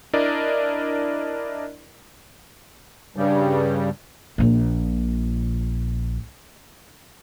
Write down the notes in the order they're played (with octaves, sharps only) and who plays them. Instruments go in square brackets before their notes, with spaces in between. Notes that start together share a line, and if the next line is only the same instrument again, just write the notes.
[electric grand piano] D4 E4 A#4 D5 D#5
[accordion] G2 C#3 G3
[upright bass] A#1 A#2